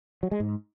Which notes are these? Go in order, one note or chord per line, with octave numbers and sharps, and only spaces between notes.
F#3
G#3
G#2